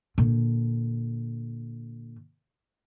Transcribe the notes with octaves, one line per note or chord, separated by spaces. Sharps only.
A#2 D3